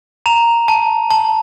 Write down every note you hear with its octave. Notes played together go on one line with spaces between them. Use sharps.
A#5 F7
A5
A5